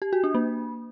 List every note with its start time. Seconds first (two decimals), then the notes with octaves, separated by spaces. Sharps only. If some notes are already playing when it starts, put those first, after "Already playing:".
0.02 G4
0.13 F#4
0.24 D4
0.34 A#3